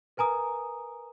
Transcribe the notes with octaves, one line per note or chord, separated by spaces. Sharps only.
A#4 B4 G#5 A#5 D#6